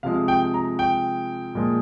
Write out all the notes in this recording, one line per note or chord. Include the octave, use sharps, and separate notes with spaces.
C3 F3 G#3 F5
G5
A#5
G5
A#2 F3 G#3